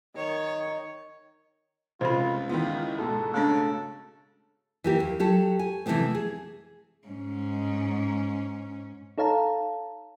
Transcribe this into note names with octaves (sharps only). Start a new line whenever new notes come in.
D#3 C#5
F1 C#2 F4 C5 B5
D#3 E3 B3 F4
G#2 B2 A4
C#3 A3 D4 A4
E3 A#3 G4
D#2
F#3 G4 A4
G#5
C3 E3 F3 A3 B3 C4
G#4
G#2 C#4
D#4 A4 C#5 F5 A5 A#5